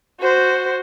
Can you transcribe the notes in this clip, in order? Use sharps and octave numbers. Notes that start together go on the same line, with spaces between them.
F#4 C5